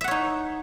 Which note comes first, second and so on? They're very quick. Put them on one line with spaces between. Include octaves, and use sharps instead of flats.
E5 F#5 C#5 D#4